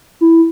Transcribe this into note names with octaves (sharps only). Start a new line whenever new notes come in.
E4